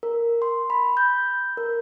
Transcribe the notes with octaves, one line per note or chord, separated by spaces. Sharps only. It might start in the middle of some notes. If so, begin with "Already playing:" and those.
A#4
C6
B5
G6
A#4